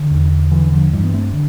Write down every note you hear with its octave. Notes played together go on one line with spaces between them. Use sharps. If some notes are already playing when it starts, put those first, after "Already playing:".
Already playing: D3
E2
D3 E3
D3 F3
G2 E3 G3
B3
A3 C4
D3